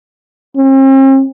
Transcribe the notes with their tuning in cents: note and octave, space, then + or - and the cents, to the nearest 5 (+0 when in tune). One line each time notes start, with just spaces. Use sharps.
C4 +45